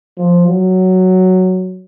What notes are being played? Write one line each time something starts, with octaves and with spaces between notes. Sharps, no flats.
F3
F#3